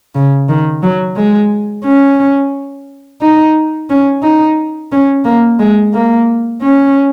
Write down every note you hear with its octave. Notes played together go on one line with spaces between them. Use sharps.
C#3
D#3
F#3
G#3
C#4
D#4
C#4
D#4
C#4
A#3
G#3
A#3
C#4